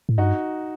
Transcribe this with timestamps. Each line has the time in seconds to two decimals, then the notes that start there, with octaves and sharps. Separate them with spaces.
0.09 A2
0.18 G2 D#4 F#4